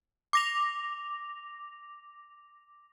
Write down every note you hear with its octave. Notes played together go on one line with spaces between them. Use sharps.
D6 A#6 F7